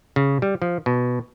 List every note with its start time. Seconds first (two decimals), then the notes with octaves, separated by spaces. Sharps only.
0.16 C#3
0.42 G3
0.62 F3
0.86 B2